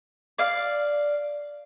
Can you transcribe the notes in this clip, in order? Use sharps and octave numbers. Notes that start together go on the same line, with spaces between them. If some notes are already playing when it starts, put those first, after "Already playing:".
D5 F5